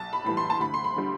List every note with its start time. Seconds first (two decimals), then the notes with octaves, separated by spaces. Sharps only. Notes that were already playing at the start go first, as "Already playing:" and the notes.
Already playing: B1 A5
0.13 B5
0.24 A2 E3 G3 B5
0.37 C6
0.50 A5
0.60 D2 B5
0.74 C6
0.84 B5
0.96 D3 G3